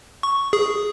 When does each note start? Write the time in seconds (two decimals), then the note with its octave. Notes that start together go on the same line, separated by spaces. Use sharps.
0.23 C#6
0.53 G#4